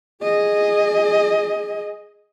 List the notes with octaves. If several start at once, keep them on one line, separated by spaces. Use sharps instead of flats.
G#4 D#5